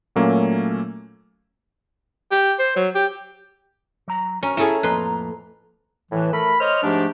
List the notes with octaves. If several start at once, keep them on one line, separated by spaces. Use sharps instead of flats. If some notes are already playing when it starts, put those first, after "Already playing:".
A#2 F#3 A3 A#3 C#4
G4
C5
F#3
G4
F#3 A#5
C#4 F#4 A#4 A#5
C#4 E4 G#4 A4 C#5
F2 A2 A#3 B4 C6
A2 E3
A3 A#4 B5
C5 C#5 D#5 F6
G#2 F3 A3 D4 G4